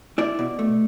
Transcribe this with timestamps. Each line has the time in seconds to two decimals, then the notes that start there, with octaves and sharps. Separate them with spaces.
0.18 E4 D5
0.39 B2
0.59 A3